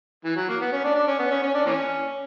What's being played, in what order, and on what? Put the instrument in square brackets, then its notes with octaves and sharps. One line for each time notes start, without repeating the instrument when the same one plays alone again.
[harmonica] E3
F#3
A#3
B3
C#4
D4
D4
C#4
B3
C#4
C#4
D4
E3 A#3 C#4